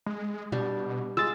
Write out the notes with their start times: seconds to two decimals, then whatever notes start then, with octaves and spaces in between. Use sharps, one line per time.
0.06 G#3
0.52 B2 G3 D4 G4
1.17 G#3 F4 E6 A6